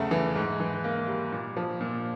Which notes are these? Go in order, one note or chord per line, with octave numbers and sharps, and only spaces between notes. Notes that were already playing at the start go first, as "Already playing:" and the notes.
Already playing: E2 C#3 A3
E3
G#2
E3
A#3
G3
A#2
F3
A#2